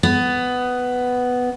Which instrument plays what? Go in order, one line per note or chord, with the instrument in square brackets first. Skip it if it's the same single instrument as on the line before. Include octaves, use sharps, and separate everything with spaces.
[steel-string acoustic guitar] B3